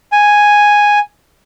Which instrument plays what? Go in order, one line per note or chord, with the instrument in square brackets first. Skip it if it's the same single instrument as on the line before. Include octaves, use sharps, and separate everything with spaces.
[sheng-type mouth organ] G#5